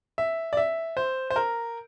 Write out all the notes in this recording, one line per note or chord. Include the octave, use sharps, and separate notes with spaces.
E5
D5
E5
C5
C5
A#4